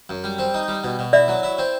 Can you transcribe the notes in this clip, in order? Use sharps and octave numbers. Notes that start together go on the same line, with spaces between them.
F#2
G3
C4
D#4
G3
B2
B2
E4 D5 E5
F#3
E4
C4